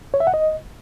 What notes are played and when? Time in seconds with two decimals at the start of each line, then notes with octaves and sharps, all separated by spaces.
0.14 C#5
0.20 E5
0.27 F#5
0.34 D#5